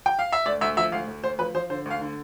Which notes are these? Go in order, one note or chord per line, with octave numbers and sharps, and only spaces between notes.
G5
F5
E5
D2 D5
D2 E5
F3 E5
D2 F5
D2
D2 C5
F3 B4
F3 C5
D3 C5
D2 F5
D3